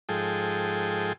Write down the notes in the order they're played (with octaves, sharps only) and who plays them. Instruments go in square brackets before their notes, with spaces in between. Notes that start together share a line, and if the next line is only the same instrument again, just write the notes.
[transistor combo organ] G#2 F3 G#4 A4 G5